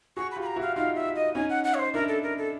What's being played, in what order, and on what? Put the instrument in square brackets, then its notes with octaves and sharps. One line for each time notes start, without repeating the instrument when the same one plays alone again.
[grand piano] F#4 G#4 [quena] C#6
[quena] B5
[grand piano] F4 G4
[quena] B5
A#5
[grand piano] E4 F#4
[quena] F5
[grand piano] D#4 F4 [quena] F5
[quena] E5
D#5
[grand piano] C#4 D#4 [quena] G#5
[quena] F#5
F#5
C#5
C5
[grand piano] D4 E4 [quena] A#4
[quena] A4
A#4
A4